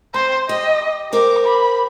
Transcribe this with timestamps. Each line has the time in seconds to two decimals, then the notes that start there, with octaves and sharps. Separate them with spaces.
0.14 C4 C5
0.49 G4 D#5
1.13 G4 A#4 C5 D6
1.44 B5